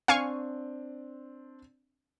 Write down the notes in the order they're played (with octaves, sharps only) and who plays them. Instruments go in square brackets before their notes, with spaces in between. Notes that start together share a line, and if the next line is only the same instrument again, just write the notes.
[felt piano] C4 D4 [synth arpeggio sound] F5 G#5 C#6